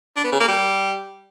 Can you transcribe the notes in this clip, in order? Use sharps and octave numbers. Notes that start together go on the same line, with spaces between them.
D4
B3
C#3
A#3
G3